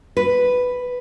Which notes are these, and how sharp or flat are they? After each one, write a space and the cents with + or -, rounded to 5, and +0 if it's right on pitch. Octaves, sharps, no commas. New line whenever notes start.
B4 +5